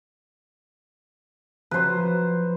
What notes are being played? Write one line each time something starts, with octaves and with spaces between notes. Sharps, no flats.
F3 F#3 B4 C5